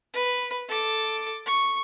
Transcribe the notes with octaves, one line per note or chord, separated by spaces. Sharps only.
B4
A4 D6
C#6